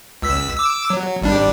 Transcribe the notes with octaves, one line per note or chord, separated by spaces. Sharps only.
C#2 E6 B6
D6 E6
F#3
G#1 G3 D4